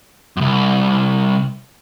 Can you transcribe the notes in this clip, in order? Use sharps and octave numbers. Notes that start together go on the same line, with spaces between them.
C2 F#2